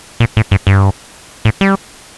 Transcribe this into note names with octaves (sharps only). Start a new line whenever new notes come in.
A#2
A2
G2
G2
A2
G3